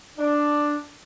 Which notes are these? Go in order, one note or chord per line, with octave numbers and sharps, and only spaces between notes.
D4